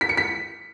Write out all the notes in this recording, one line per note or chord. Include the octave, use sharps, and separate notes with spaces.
B6
C#7
B6